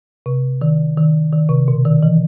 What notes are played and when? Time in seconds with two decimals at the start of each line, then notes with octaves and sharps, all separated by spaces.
0.26 C3
0.62 D#3
0.97 D#3
1.32 D#3
1.49 C3
1.68 B2
1.85 D#3
2.03 E3